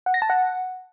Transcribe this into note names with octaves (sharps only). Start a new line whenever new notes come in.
F#5
A#6
A5
F#5